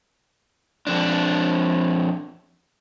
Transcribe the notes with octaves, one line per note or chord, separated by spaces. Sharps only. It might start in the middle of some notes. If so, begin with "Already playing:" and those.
F2 D4